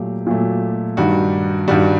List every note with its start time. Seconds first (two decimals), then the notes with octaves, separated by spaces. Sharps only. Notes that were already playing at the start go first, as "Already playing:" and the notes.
Already playing: A#2 F#3 A3 G4
0.27 A#2 F#3 A3
0.97 G2 D#3 G3 F#4
1.68 G2 D#3 G3 F#4